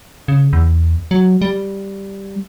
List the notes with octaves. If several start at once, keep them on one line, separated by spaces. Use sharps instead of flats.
C#3
E2
F#3
G3